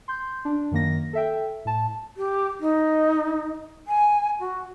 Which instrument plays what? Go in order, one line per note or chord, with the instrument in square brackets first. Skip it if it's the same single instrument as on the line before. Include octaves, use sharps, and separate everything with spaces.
[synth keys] C6 G6
D4
F#2 D#3 A#3 A#6
A4 E5 G5
A2 A5
[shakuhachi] G4
D#4
G#5
F#4